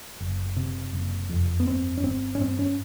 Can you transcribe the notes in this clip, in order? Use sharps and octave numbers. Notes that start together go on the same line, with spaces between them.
F#1
C3
F#1
F2
B3
G1 C4
C#4
G1 C4
C#4
G2 C4
C#4